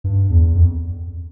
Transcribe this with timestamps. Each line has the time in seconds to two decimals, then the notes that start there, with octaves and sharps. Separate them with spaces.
0.04 G2
0.30 E2
0.55 F2